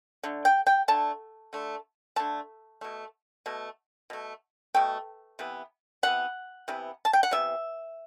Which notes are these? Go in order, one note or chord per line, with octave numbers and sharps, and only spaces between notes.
D3 A3
G5
G5
D3 A3 A5
D3 A3
D3 A3 A5
B2 A3
B2 A3
B2 A3
B2 A3 G5
C3 E3 B3
C3 E3 B3 F#5
C3 E3 B3
A5
G5
F#5
C3 E3 B3 E5